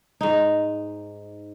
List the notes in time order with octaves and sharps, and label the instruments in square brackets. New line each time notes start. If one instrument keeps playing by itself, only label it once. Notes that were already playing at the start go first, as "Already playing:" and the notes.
[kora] G#2 D#4